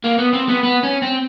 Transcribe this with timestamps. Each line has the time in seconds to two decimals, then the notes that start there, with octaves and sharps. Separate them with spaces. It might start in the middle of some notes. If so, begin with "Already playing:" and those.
0.04 A#3
0.18 B3
0.33 C4
0.49 B3
0.63 B3
0.83 C#4
1.02 C4